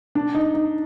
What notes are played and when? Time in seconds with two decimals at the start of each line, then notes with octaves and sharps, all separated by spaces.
0.15 D4
0.35 D#4
0.54 D#4